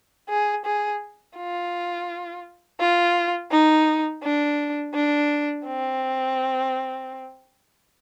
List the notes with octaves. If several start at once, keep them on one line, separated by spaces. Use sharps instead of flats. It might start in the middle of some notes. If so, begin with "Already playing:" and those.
G#4
G#4
F4
F4
D#4
D4
D4
C4